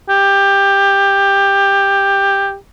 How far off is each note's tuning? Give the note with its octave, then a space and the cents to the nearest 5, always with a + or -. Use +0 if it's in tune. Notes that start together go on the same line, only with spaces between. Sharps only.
G4 +15